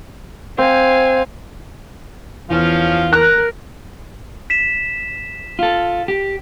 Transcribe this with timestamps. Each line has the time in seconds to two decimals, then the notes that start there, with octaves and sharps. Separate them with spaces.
0.58 C4 F5 G#5
2.50 E2 F3 C#4 F4
3.13 A#4 A#5 F#6
4.50 B6 E7
5.59 F4 A4
6.08 G4